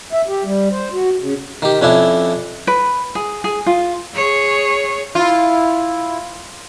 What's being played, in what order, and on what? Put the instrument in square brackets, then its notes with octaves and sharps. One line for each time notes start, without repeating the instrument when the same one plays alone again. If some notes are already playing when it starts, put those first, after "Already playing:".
[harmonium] E5
G4
G3
C5
F#4
C#3
[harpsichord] D#3 G4
F2 C#4 D4 E4
[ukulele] B4
G#4
G#4
F4
[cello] G#4 C#5
[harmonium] E4 [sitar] F4